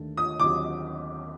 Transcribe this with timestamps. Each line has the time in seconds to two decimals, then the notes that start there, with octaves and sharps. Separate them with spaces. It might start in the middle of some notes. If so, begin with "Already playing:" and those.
Already playing: D#2 D3 A3 D4 A4
0.17 D#6
0.40 D#2 D3 F#3 C4 G4 D6